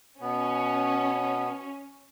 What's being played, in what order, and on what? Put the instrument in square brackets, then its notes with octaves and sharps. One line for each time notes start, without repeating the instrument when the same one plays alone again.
[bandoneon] B2 B3 [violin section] C#4